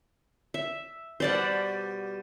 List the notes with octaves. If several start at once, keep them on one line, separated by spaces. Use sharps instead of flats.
E5
B2 G3 C5 D5 F#5